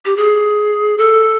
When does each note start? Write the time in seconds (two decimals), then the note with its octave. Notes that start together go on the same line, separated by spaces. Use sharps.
0.05 G4
0.17 G#4
0.98 A4